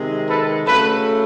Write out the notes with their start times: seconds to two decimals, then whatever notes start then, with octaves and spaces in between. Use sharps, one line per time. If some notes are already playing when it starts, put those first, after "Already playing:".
Already playing: C3 D#3 G#3
0.28 A4 B4
0.65 C#3 F#3 A3 A4 B4